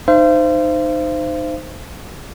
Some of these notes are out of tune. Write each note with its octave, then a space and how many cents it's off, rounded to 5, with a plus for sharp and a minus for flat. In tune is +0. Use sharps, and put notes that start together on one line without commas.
D#4 -20 C5 -15 F5 -45